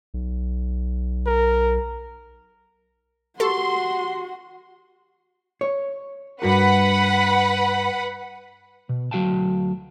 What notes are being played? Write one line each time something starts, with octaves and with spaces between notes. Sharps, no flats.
B1
A#4
F#4 G4 A4 C6 C#6
C#5
G2 F#4 A#4 B4 F#5 B5
B2
D2 F#3 F#4 F5 G5 A5